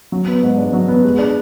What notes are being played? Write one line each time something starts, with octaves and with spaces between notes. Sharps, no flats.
F#3
B3
G#2
D4
F#3
B3
G#3
D4